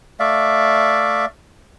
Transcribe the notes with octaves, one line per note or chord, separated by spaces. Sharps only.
A3 D5 E5 F5